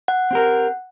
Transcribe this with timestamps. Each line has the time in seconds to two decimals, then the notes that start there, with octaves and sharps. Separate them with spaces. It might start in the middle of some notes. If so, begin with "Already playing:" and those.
0.08 F#5
0.31 C4 G4 A#4